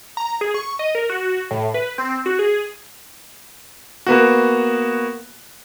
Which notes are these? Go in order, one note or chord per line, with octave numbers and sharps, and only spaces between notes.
A#5
G#4
C#6
D#5
A#4
F#4
A2
B4
C4
F#4
G#4
A#3 B3 F#4